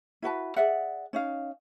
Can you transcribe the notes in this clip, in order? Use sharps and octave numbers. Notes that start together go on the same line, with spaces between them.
E4 F#4 B4 A5
G#4 D5 E5 F#5
C#4 D#4 F5